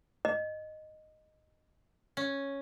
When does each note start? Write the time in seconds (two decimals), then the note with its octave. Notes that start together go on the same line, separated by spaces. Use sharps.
0.25 D#5
2.17 C#4